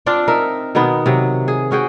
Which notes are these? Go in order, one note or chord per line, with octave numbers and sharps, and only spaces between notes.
C4 D4 F4 D5
D#4 A#4 E5
B2 D#3 B3 D#4
C3 F#3
G#4
C#4 F#4 G#4 G5